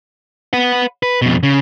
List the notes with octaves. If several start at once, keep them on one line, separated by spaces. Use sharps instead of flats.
B4 F#5
B4
F2 B2
C#3